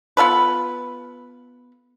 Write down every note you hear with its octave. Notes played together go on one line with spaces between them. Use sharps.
B3 F4 A4 B4